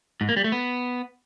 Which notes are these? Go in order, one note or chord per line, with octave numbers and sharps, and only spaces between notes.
G#2
A#3
G3
A3
B3